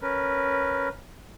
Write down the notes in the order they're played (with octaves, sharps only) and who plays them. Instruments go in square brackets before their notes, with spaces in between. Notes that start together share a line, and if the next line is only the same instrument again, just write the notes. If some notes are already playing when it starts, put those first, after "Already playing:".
[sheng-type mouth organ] C#4 A#4 B4